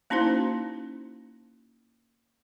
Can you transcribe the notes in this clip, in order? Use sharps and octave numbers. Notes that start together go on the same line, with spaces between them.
A#3 C#4 D#4 E4 F#4 C5